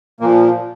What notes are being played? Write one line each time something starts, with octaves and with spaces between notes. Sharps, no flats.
A#2 F3 A#3